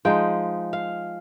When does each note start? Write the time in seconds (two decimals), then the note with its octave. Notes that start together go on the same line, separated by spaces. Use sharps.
0.05 F3 G#3 D#4 G5
0.73 F5